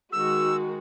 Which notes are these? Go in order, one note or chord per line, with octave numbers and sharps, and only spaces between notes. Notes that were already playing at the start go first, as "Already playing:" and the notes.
D#3 G#3 F#4 E6